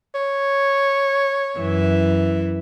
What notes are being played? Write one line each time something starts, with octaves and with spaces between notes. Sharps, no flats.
C#5
F#2 E3 E5